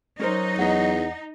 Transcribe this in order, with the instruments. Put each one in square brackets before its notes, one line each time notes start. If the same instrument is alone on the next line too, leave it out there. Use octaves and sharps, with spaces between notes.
[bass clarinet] F#3 [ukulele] C#4 A#4 C5 [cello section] D#4
[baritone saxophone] E2 [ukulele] D#5 F#5